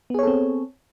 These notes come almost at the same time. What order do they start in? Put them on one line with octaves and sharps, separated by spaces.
B3 G#4 C#5 A4 C4